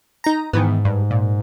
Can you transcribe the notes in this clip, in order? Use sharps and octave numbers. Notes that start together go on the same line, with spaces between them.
D#4 A#5
G#2 D#3 E3 B3
G2
A#2